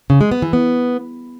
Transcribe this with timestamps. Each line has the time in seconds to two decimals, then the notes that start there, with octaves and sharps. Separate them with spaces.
0.10 C#3
0.21 G#3
0.31 B3
0.42 E3
0.53 B3